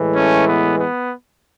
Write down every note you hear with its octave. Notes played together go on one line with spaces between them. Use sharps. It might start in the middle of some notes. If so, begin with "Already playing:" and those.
Already playing: A2 E3 G#3
A3 C#4
B3
B3